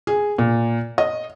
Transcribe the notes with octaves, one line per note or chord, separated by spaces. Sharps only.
G#4
A#2
D#5